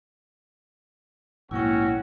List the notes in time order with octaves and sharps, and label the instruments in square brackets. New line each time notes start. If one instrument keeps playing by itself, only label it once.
[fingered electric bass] A#1 G#2 A#3 [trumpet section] C#4 F#4 [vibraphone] E4 G5